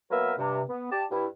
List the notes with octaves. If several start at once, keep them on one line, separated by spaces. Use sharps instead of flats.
F#3 A#3 B3 A#4 B4 E5
G2 C3
B3
G4 D5 A5
G2 E4